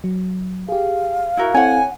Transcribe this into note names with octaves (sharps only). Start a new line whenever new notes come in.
F#3
G4 G#4 F5
E4 F#4 A#4
C4 E4 A4 C#5 F#5 G#5